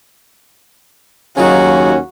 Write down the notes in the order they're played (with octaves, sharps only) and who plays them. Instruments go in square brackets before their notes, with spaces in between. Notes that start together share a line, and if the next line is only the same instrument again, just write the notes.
[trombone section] D#2 [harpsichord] C#3 F#3 D#4 [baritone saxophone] C#4 [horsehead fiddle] F#4